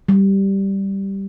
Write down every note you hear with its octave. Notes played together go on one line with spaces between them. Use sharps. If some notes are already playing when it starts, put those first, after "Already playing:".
G3